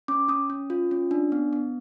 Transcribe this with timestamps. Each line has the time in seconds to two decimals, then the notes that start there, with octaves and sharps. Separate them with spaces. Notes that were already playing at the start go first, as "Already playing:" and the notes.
0.08 C#4 D6
0.28 C#4 D#6
0.50 C#4
0.70 F4
0.91 C#4
1.11 D4
1.32 B3
1.53 B3